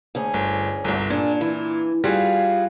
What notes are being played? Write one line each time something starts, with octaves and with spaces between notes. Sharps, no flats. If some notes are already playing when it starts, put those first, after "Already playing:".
D2 C#4 G#4
G1
G1 C2
A#2 D4 G#4
E3
G3 F4 F#4 G#4